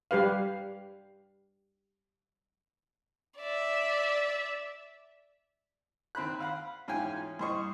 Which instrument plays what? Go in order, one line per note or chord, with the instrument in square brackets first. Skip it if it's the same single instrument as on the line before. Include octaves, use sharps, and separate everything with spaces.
[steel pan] G3 G4 B4 F5
[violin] D5 E5
[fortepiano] D#2 C4 C5 B5 F#6
F5 F#5 B5
E2 G#2 C#4 F4 G5 G#5
G2 E3 C5 D#5 C#6